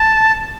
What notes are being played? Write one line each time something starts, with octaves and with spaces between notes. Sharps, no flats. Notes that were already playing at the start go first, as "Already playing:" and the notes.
Already playing: A5